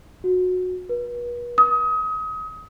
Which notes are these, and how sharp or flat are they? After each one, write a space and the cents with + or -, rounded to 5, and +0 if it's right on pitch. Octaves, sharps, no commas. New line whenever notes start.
F#4 -20
B4 -40
D#6 +30